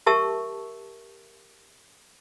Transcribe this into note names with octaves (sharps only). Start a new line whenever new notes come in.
G4 A#4 E5 A5 C#6 E6